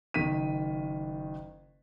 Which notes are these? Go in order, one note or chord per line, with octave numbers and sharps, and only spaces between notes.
F#1 D#3 B6 D#7